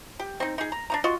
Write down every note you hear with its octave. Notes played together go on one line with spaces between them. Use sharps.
G4
C4 D#4
D#4 G#4
A#5
D4 D#4 A#5
F4 F#4 D#5 C6